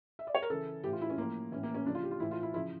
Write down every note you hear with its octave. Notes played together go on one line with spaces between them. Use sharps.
E5
D5
C#5
A#4
C#3 E3 A4
A2 E3 G4
F4
E4
C#4
A2 F3 A#3
A2 E3 C#4
A#3
C#4
C#3 F3 D4
F4
G4
F4
A2 E3 E4
F4
E4
C#3 F3 E4